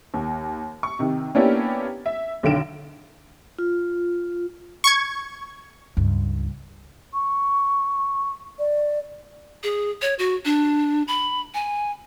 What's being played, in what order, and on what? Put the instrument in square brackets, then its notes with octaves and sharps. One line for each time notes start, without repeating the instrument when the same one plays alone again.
[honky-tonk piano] D#2
C#6
C3 D#3
A#3 B3 C#4 D4 E4 G4
E5
B1 D3 D#3 D7 E7
[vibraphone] F4
[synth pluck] C#6 G#6
[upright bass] C#2 G2
[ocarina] C#6
D5
[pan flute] G#4
C#5
F#4
D4
B5
G#5